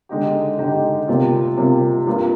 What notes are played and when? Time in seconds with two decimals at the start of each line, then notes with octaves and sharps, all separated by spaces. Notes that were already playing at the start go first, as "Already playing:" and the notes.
0.09 D3 G#3 D#4 G4
0.59 D3 G#3 D#4 G4
1.08 C3 G3 A#3 F4
1.58 C3 G3 A#3 F4
2.07 G2 F3 A#3 F4